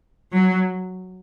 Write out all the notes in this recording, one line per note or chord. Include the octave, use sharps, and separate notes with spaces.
F#3